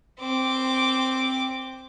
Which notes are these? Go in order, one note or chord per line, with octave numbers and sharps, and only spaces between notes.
C4 D6